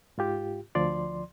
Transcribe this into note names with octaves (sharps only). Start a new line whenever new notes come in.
G#2 F4 G4
D2 F3 D5 C6